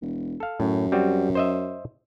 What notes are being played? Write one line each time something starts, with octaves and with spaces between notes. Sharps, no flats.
E1
A4 F5
F#2 A2
G3 C4 F#4
C5 D#5 E5